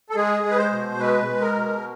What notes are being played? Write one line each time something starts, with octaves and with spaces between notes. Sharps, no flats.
A4
G#3 G#4
G#3
B4
C5
B2
G#3 B4
G#3
A#4
B2